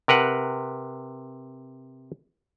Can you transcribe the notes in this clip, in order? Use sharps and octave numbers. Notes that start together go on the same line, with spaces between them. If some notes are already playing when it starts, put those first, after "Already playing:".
C3 A#4 B4 F#5